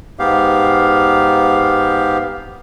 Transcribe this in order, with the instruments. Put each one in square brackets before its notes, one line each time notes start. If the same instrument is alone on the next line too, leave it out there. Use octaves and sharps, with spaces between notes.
[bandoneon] G#2 B3 G4 F5